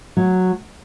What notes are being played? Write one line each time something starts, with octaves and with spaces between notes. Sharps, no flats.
F#3